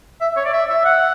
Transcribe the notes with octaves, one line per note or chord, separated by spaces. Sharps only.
E5
C#5
D5
E5
E5
F#5